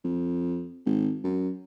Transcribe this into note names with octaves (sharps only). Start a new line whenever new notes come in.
F2
G#1
F#2